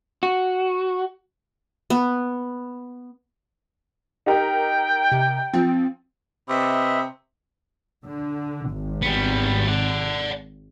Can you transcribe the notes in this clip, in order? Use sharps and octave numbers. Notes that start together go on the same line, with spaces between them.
F#4
B3
D#4 G4 A#4 G5
C3
F3 C4
C3 B4 D#5 E5
D3
G#1
G3 B3
D5 F#5